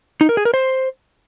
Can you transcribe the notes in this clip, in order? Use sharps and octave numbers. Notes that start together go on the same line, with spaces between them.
D#4
A#4
G#4
A#4
C5